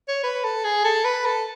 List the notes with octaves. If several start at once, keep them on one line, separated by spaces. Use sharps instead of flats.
C#5
B4
A4
G#4
A4
B4
A4